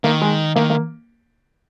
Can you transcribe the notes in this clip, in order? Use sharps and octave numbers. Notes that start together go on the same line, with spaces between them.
D#3 A#3
G#3
D#3 A#3
A#3